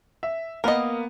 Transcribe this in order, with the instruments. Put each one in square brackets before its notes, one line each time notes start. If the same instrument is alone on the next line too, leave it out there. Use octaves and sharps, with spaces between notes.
[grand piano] E5
[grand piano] A#3 B3 [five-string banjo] A#4 D#5